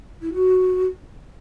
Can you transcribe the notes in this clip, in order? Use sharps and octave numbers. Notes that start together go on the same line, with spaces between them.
E4
F#4